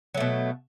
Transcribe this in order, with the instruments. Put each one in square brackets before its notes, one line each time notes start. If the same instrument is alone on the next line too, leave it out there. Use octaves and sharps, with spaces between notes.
[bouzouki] F#3
A3
B2